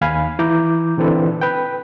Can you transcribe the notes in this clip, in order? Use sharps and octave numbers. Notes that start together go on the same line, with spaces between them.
D#2 F5 G#5 B5
E3 E4 A#5 D6 G6
A#2 D3 E3 C4 A4 B4
B4 G5